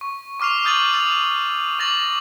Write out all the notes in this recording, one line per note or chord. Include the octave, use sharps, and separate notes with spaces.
C#6
C#6 D6 F6 C7 F7
D#6 G6 A6 D#7 F#7
E6 A6 F7
C#6 D6 A6 A#6 F#7